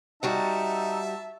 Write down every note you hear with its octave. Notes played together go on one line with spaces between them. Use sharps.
G3 D#4 F#4 E5 F#5 A5